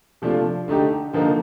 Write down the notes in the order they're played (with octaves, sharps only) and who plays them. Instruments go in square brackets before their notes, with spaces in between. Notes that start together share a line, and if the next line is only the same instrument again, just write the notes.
[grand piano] C3 F3 A3 D4 F4
D3 A3 D#4 G4
D3 F3 A#3 D#4